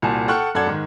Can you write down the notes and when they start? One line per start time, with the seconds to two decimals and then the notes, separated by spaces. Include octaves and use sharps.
0.02 C2 A#2 F#4 G#5 A5
0.28 A4 F#5 G5 C#6 F6 F#6
0.55 F#2 A4 D5 F#5 G#6
0.66 G#2 D#3